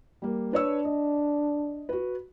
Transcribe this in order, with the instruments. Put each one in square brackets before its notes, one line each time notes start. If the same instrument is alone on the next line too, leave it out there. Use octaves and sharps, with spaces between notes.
[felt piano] G3 A#3
[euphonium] D4 [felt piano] B4 C#5 E6
[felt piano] D#5
F#4 B4